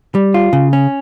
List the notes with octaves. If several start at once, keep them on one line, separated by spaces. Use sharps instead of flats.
G3
F4
C#3
C#4